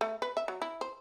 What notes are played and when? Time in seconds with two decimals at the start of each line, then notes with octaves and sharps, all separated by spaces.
0.01 A3
0.22 B4
0.37 E5
0.48 F#3
0.62 E4
0.81 C5